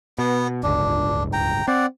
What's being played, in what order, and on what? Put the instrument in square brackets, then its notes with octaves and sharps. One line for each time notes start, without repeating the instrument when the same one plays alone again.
[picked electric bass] B2 [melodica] B3
[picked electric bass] D1 G1 C#2 [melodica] D4
[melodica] G5 A#5
[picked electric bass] C4 [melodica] D5 F#5